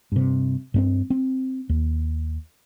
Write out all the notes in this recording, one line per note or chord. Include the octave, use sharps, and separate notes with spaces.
G2 C3
G2 B3 C4
C4
D#2